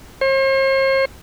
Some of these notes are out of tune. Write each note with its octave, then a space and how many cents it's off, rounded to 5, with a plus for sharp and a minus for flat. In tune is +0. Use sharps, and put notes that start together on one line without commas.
C5 +45